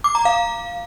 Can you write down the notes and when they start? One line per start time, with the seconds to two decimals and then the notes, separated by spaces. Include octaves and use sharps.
0.04 D6
0.15 A#5
0.25 F5